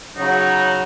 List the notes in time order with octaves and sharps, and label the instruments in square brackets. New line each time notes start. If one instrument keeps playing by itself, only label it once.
[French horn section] C#3 F#3 [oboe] D#4